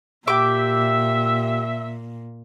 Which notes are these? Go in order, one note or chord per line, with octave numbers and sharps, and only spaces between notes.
A#2 G4 E5 D6